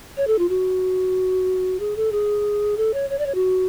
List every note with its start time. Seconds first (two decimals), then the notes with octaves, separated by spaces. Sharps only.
0.17 C#5
0.27 A4
0.39 F4
0.49 F#4
1.79 G#4
1.96 A4
2.12 G#4
2.77 A4
2.94 C#5
3.10 C#5
3.18 D5
3.26 C#5
3.35 F#4